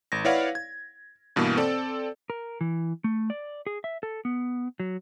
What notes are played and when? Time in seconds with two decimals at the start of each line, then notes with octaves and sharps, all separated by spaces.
0.12 G#1 A#6
0.25 E4 B4 C#5 D5 F5 F#5
0.55 G#6
1.36 G2 B2 E3 A#3
1.57 C4 A4 D5
2.30 A#4
2.61 E3
3.04 A3
3.30 D5
3.67 G#4
3.84 E5
4.03 A4
4.25 B3
4.80 F#3